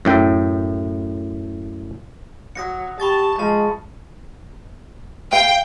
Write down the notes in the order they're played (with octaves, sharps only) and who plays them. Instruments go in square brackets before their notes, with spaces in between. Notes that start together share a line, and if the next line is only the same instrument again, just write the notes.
[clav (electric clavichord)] F#2 A2 G5
[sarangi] F#3 [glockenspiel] D#6 A#6 C#7
[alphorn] G4 [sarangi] A5 [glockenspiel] B5 C#6 A6
[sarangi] F3 [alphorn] G#3 [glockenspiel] A5
[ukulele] F5 [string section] G5